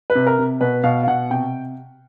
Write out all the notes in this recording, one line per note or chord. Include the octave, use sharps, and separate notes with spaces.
B4
C3
A#4
C3
B2 B4
B2 F5
F5
B2 F#5
C3 G5